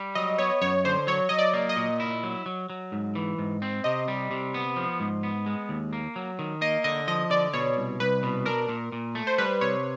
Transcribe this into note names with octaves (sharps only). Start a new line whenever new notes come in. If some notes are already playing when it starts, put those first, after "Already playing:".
Already playing: G3
F#3 D#5
B3 C#5
F#2 C#5
D3 C5
F#3 C#5
F#3 D#5
D5
A#3
D#5
A#2
E4
F#3
F#3
F#3
G#2
E3
G#2
C4
C3 D#5
G3
C3
B3
F3
G#2
B3
G#3
D#2
A#3
F#3
D#3
A#3 D#5
D3 D#5
F3 D#5
D3 D5
B2 C#5
C2
C2 B4
B2
D4 A#4
A#2
A#2
A3
C5
G3 B4
C3 C#5